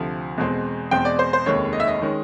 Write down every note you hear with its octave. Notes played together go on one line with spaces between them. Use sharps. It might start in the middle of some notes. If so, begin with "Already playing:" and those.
Already playing: D2 C3 F3
E2 B2 G#3 C4
E2 B2 G#3 C4 G5
D5
C5
C5
F1 D#2 D#3 G#3 C#4 C#5
D#5
E5
D#5
D#3 G#3 C#4